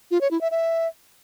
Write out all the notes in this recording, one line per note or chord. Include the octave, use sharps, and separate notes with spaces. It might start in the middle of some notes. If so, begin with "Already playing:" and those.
F4
C#5
E4
E5
E5